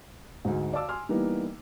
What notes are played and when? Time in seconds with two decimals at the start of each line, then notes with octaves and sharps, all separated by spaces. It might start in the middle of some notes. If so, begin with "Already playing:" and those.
0.45 D2 G#2
0.73 D5 F5 A5 D6 E6
0.89 G#5 C6 F6
1.09 E3 G3 A#3 B3 D#4